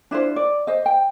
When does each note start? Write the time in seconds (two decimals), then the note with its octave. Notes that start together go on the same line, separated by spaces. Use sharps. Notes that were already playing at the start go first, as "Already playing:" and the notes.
0.11 D4 E4 F4 C5
0.36 D5
0.67 C5 D#5
0.86 G5